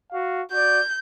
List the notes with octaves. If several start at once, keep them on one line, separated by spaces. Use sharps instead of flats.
F#4 F5
F#4 D5 G6